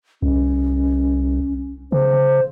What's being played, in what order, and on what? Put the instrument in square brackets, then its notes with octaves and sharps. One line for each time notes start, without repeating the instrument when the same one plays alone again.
[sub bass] C2 [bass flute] C#4
[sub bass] C#3 [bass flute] C5